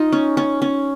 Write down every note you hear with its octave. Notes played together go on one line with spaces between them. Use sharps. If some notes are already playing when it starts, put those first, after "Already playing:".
Already playing: D#4 F4
C#4
C#4
C#4